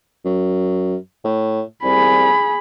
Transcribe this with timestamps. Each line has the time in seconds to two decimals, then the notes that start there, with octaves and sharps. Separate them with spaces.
0.25 F#2
1.24 A2
1.83 C2 G#4 B5